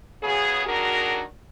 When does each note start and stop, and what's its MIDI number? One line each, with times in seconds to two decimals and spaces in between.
0.23 0.64 49
0.23 0.64 54
0.23 0.64 59
0.23 0.64 68
0.66 1.21 51
0.66 1.21 54
0.66 1.21 62
0.66 1.21 66
0.66 1.21 68
0.66 1.21 70